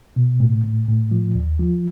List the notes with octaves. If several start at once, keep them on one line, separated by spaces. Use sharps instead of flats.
B2
A2
A2
A2
F3
D#2
F3